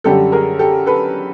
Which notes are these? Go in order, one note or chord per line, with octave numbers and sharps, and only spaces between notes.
F#2 D3 G3 G4 A4
G#4 A#4
G4 A4
A4 B4